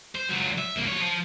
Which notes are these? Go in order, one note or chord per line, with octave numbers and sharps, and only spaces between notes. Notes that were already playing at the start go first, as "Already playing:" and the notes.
C5
C#2 F#3
E5
C2 A#3
F3 C#5
F3